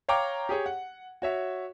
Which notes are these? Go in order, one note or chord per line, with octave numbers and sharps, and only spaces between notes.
C#5 F5 G5 A#5 D6
G4 G#4 C#5
F#5
F#4 C#5 E5